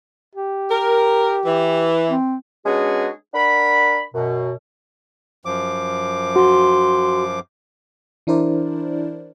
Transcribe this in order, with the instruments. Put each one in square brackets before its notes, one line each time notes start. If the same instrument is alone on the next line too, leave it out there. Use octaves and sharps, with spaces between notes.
[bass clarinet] G4
[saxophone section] A#4
E3
[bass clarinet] C4
[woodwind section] G#3 B3 C#4 D4 F#4 G#4
D4 A#4 F#5 B5
F#2 B2
[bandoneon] F#2 F3 D6
[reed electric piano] F#4 [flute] C6
[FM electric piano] E3 D4 E4 A#4 C5 D5